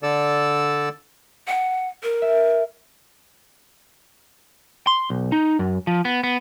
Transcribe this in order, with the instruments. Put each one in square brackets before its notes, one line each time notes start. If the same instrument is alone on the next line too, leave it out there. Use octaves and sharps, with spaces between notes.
[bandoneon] D3 A4 D5 E6
[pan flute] F#5
A#4
[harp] E5
[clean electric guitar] C6
B1
D#4
F#2
F3
B3
B3